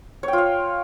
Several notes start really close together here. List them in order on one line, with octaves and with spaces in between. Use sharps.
C#5 G5 F4 F5